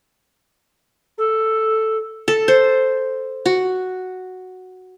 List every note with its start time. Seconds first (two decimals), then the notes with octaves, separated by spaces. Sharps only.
1.17 A4
2.28 A4
2.48 C5
3.46 F#4